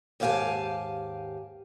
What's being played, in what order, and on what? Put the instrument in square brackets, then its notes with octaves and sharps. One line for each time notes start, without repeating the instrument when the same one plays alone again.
[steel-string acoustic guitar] D#2 G#2 G4 F5 G#5 A5